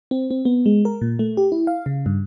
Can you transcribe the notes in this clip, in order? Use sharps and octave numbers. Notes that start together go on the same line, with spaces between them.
C4
C4
B3
G#3
A#4
A#2
A3
G4
E4
F5
C#3
G2